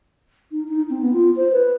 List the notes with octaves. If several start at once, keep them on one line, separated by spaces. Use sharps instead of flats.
D#4
D#4
C4
B3
F4
C5
B4